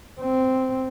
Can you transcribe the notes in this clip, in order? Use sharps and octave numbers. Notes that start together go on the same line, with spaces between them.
C4